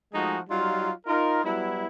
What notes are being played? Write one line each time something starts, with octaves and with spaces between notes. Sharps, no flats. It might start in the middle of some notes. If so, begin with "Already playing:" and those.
F3 G#3 A3 D#4 F#4 G#4
F#3 G3 D#4 F4
D#4 F4 A#4
F#3 G3 B3 E4